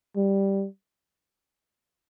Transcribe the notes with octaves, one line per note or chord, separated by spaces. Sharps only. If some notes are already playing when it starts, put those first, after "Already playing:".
G3